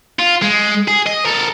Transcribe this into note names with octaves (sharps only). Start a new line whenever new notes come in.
F4
G#3
G#4
D#5
A4 A#4